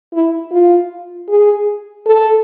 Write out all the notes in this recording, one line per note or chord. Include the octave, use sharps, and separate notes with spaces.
E4
F4
G#4
A4